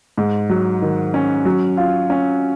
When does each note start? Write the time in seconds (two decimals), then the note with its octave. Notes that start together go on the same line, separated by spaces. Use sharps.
0.18 G#2
0.50 F#3
0.82 D#3
1.14 C#4
1.45 F#3
1.77 F4
2.10 C#4